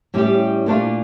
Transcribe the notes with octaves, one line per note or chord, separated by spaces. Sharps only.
A2 G3 C#4 E4 G4
A#2 A3 D4 F4